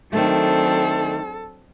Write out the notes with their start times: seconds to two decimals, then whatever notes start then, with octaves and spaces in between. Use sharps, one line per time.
0.13 D#3 F#3 A3 C4 D4 A4